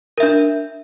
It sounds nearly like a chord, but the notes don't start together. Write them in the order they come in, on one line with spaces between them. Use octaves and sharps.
A#4 E5 D4